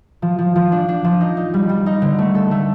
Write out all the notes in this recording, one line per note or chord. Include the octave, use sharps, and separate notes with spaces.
F3
F3
F3
D4
D4
F3
D#4
D#4
G3
G3
D#4
D3
A3
A4
A3